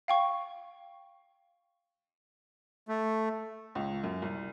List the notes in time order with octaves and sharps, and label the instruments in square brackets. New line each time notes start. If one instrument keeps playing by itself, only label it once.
[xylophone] F5 G5 C#6
[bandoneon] A3
[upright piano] C#2
F#2
C2